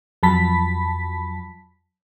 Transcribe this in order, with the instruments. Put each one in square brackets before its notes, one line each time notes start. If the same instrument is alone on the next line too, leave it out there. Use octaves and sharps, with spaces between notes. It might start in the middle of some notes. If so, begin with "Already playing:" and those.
[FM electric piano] F2 F#3 A5 B5 B6